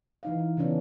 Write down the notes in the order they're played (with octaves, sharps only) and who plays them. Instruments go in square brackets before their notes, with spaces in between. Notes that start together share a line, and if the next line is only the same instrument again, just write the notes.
[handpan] E3 D#4 F5
E4
C#3 E3 B3 C#4 D4